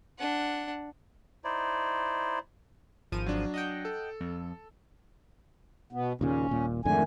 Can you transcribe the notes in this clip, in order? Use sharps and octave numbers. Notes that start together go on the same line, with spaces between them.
D4 F#5
D#4 E4 C5 D5
G#1 F3 D#7
F#3 D4
D#5 F#5 G5
A4
F2
B2 B3
D#2 A#2 C#3 C#4
D#1 A#2
F2 G#2 D3 D#3 A3 G#5